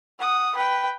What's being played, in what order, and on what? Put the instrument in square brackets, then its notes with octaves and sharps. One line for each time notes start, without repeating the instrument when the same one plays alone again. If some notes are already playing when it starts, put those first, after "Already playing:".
[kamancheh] F#5 D#6
B4 G5